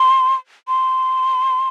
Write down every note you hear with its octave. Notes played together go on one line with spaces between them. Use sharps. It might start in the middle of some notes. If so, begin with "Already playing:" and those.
Already playing: C6
C6